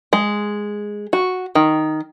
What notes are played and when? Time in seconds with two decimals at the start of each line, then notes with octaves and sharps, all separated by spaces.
0.13 G#3
1.13 F#4
1.55 D#3